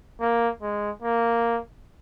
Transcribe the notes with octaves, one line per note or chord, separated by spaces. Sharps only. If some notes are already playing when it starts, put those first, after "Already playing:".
A#3
G#3
A#3